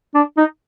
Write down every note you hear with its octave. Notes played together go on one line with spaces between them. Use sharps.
D4
D#4